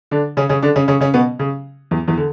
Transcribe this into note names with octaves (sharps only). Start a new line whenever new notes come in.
D3 D4
C#3 C#4
C#3 C#4
D3 D4
C#3 C#4
C#3 C#4
C#3 C#4
B2 B3
C#3
E2 E3
E2 E3
D3